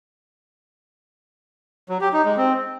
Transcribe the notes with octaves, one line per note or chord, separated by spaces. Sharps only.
F#3
G4
D#4
G#3
C4